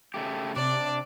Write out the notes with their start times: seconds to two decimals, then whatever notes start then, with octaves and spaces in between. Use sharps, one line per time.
0.14 C#3 A3 G4
0.56 C3 D4 D5